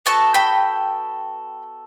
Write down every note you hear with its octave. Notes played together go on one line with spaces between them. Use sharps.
B3 F#4 A4 A5 C#6
G5 B5